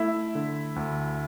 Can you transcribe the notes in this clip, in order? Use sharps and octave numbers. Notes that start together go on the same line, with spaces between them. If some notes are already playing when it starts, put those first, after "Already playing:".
Already playing: A3 E4 E5
D3
D2